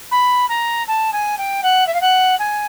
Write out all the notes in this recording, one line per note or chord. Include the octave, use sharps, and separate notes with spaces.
B5
A#5
A5
G#5
G5
F#5
E5
F5
F#5
G#5